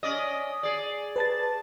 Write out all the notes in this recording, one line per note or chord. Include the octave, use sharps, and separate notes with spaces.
C#4 D5 D#5
G#4 D5
B4 A5 A6